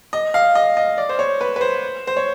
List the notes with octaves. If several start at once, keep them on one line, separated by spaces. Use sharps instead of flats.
D#5
F5
D#5
D#5
D5
C5
C#5
B4
B4
C5
C5
C#5